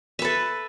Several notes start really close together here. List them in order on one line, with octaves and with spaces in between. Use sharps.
E5 B4 A4